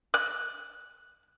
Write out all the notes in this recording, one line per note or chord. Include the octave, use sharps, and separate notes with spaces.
F#6